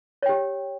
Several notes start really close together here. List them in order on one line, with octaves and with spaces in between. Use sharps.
C#5 G5 G4